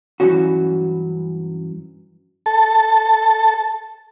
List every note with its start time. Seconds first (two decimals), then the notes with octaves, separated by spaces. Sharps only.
0.20 G2 E3 F#3 C#4 F#4
2.46 A4 A5